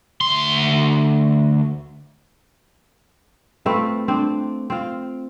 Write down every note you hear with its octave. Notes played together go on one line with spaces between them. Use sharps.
D2 C6
A3 C4 F4 B4
C4 D4
C4 F4